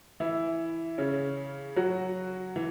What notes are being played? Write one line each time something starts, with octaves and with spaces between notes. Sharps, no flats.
E3 E4
C#3 C#4
F#3 F#4
E3